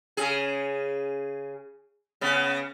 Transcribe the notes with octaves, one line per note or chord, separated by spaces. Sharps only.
C#3 G#4
C#3 B3